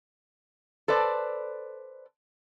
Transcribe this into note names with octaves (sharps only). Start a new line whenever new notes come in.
A4 B4 C5 D5